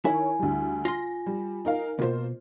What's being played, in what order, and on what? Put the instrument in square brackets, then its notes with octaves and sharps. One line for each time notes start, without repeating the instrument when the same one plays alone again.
[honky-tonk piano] D#3 A#4 C#5 [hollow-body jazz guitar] E4 [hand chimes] G#5
[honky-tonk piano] D2 G3
[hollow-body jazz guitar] F4 C6 [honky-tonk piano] A#6
[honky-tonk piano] G3
D#4 A#4 F5
[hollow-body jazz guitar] C#2 B2 [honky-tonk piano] A#3 F4 C5